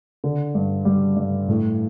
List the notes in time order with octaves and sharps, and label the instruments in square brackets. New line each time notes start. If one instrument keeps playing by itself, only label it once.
[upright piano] D3
G2
G3
G2
A2